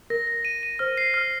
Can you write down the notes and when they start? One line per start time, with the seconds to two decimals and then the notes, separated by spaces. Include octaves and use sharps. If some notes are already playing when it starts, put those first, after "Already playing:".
0.10 A#4 A#6
0.27 A#6
0.45 D#7
0.63 D#7
0.79 C5 F6
0.97 C7
1.14 F6